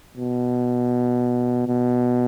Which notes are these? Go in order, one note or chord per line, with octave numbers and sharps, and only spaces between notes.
B2
B2